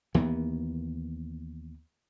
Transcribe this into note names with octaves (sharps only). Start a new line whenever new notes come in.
D#2 E3 A#3 B3